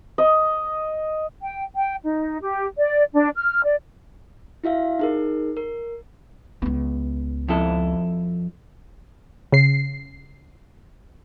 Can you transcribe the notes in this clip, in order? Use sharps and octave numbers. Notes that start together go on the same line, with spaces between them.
D#5
G5
G5
D#4
G4
D5
D4
F6
D5
E4 F#4 E5 F5
D#4 G#4 A#4
A#4
C#2 B3
F2 E4 A4
C#3 C7